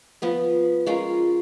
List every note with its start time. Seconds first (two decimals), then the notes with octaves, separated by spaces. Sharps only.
0.22 F3 B3 B4
0.87 G#3 C#4 F4 A#4